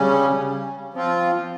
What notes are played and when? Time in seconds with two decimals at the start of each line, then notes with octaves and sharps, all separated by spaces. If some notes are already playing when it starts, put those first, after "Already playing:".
Already playing: C#3 G3 C#4
0.94 F3 C4 F4